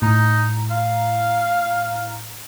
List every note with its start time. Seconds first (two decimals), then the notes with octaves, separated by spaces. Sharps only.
0.02 A2 D#4 A#5
0.71 F5